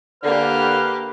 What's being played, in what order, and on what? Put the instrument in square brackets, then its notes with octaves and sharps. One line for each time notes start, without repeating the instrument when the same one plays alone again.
[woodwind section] D3 [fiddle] A#3 G4 [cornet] B4 [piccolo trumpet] F6